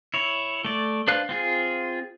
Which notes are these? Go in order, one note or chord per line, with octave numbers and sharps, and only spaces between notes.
E4 C#5
A3 D5
D4 B4 C5 F5 F#6
C4 F4 G#4